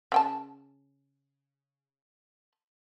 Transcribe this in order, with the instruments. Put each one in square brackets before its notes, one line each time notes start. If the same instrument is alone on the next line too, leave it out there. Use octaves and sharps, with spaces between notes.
[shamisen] C#3 G5 A5